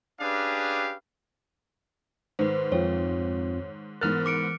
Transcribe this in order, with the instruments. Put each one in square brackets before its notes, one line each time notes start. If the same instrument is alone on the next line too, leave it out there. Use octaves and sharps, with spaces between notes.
[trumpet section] C#4 D4 G4 G#4 B4 F5
[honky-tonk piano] G#2 D#3 [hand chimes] B4 C5
[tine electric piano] F2 C4 F4 [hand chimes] C#5
[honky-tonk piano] G#2 B3 A6 [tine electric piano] E3 F6 F#6 [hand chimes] A#4
[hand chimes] D6 C#7 D7